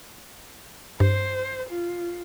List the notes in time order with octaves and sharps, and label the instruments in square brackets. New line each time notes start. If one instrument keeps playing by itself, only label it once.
[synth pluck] G2 [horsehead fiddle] C5
[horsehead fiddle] F4